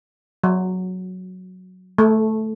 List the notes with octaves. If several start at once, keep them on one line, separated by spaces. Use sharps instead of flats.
F#3
A3